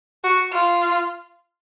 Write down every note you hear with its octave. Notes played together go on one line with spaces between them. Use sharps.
F#4
F4